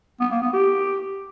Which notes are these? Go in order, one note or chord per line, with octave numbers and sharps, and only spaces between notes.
B3
A#3
B3
G4